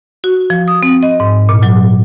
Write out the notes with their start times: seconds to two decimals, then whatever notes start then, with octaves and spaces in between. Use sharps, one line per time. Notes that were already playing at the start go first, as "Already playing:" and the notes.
0.24 F#4
0.50 F3
0.68 D#6
0.83 C4
1.03 D#5
1.20 G#2
1.49 A#2
1.63 F#3